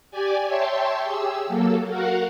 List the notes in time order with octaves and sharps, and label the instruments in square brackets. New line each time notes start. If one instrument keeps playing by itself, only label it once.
[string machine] G4 D5 G#5
C#5 E5 G5 A5 C6
G4 G#4 E6
F#3 A#3 A4
F#4 A#4 F5 F#5